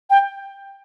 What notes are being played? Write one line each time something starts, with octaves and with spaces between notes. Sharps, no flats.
G5